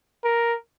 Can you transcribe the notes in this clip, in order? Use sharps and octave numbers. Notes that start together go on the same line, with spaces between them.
A#4